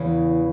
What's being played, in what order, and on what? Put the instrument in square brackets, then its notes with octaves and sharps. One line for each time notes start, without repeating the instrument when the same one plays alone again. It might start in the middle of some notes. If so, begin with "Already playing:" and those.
Already playing: [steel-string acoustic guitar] E2 C#3 E3